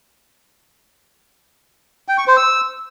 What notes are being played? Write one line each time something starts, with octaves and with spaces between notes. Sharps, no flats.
G5
C#6
C5
E6